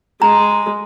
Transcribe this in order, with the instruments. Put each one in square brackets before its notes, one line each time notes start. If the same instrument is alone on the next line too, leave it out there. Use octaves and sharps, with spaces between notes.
[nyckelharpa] G#3 [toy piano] A#5